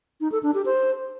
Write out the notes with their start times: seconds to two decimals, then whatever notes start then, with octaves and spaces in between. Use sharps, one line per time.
0.21 D#4
0.32 A4
0.43 D4
0.54 G4
0.66 C5